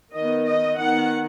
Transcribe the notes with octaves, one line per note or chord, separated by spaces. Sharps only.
D#3 D#5
B3
D#5
D#3 B3 F#5